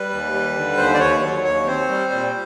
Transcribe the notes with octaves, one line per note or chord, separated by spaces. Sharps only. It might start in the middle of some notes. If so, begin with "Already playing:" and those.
Already playing: G3 B4
D#2
G3
D3
D#2 C5
D5
D#2 C#5
F#3
D#2 C#5
C4 C5
G3
A#2